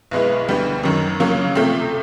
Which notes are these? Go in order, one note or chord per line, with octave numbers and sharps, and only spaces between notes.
B1 B2 G#3 B3 E4
D2 D3 G3 B3
F#2 D#3 F#3
C#3 F#3 A#3 C#4 F4
C3 F3 A3 C4